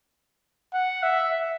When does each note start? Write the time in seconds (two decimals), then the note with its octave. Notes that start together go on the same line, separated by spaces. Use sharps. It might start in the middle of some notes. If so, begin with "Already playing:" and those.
0.73 F#5
1.03 E5